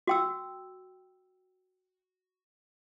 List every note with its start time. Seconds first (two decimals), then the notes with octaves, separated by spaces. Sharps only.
0.07 F#4 G5 E6